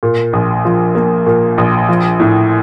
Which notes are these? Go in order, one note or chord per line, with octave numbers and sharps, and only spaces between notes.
A#2
A#1
F3
A#3
A#2
A#1
F3
A2